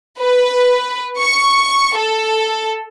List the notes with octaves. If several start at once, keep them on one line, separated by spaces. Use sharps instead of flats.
B4
C#6
A4